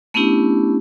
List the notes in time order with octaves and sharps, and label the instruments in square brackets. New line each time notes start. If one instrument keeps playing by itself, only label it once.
[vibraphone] A3 B3 C#4 D4 E4 G4